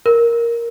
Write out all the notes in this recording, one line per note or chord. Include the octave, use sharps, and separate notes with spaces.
A#4